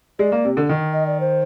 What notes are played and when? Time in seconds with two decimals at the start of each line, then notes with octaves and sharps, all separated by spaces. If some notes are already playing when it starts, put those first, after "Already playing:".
0.19 G#3 D5
0.32 A#3
0.45 C3
0.57 D3
0.69 D#3
0.93 D#5
1.07 D5
1.20 C5